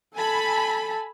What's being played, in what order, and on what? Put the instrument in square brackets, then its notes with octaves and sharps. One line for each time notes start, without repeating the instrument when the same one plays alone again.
[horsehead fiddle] A4 A5 [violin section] G#5 B5